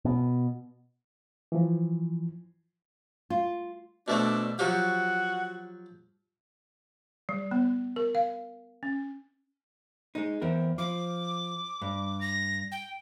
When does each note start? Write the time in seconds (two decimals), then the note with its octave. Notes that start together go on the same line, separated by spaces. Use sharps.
0.05 B2
1.52 E3 F3
3.30 F4
4.08 B2 A3 C4 D4
4.59 F3 F#3 F#4 G4
7.29 G3
7.51 B3
7.96 A#4
8.15 F5
8.83 C#4
10.15 G#3 D#4
10.41 E2 C4 A#4
10.78 F3 D6
11.82 G2
12.21 A#6
12.72 G5